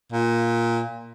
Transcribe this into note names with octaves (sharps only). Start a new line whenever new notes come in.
A#2